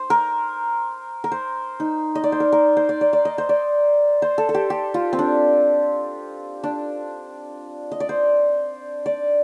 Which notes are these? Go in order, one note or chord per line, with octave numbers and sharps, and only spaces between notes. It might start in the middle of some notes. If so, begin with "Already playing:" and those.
Already playing: C5
A#4
A#4
C5
D#4
D#5
D5
C5
A#4
A#4
C5
D5
D5
D5
D#5
C5
D5
C5
A4
A4
G4
G4
F4
C4
D4
D4
D#5
D5
C5
D5